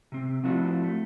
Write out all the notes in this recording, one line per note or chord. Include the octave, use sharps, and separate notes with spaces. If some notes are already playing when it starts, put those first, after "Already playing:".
C3 C4
F3 A3 C4 D4 E4 F#4
A3